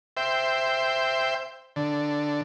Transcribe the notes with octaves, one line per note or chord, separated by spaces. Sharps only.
C5 E5 G5
D3